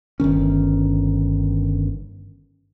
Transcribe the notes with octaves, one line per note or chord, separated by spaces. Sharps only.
G1 G2 D#3 C#4